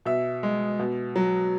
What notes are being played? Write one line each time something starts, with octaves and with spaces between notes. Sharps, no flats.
B2 E5
G#3
B2
F#3